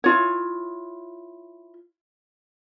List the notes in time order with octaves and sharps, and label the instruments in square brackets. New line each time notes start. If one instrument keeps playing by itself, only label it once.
[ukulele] E4 F4 C#5